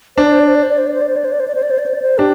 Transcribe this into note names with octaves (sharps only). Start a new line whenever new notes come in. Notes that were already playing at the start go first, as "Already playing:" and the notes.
D4 C5
D5
C5
D5
C5
D5
C5
D5
C5
D5
C5
D5
C5
D5
C5
D5
C5
D5
C5
D5
C5
D5
C5
D5
C5
D4 G4